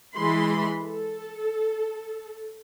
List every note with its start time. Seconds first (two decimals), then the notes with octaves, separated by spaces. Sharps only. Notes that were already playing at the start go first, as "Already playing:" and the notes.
0.15 E3 G#3 B5 C6
0.82 A4